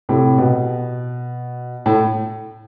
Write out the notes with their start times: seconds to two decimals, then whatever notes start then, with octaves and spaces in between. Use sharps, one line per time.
0.09 A2 C3
0.38 B2
1.86 A2